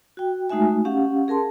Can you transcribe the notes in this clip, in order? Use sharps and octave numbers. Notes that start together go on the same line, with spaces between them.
F#4 G5
G#3 A3 D#4 F#4 E5 G#5
C#4 G4 F5 F#5
G#4 A#4 A5 C6